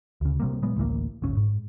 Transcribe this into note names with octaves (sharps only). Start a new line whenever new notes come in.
D2 C#3
C3 G3 A#3
A#2 F#3 G#3 B3
A1 D2 E3 A#3
D1 G1 C#4
G#2